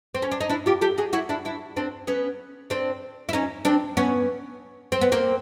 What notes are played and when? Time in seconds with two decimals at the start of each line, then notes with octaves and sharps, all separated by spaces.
0.15 C4
0.22 C#4
0.31 D4
0.41 D#4
0.49 D4 E4
0.66 F4 G4
0.81 G4 A4
0.98 F#4 G#4
1.13 E4 F#4
1.29 D4 E4
1.45 D4 E4
1.77 C4 D4
2.07 B3 C#4
2.70 C4 D4
3.29 E4
3.33 C#4 D#4
3.65 C4 D4
3.97 B3 C#4
4.92 C4
5.01 B3
5.12 A#3 C4